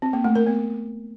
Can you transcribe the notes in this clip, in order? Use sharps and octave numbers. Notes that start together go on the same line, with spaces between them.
C4
A#3
A3
A#4
B3